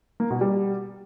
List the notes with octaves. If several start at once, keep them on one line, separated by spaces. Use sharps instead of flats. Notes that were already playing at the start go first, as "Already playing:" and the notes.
A#3
B2
G3